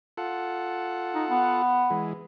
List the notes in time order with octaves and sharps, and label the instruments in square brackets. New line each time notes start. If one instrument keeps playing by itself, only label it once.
[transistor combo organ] F4 A4 F#5
[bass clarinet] D#4
B3
[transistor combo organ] E3 G#3